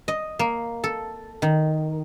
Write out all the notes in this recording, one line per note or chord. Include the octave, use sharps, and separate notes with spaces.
D#5
A#3
A4
D#3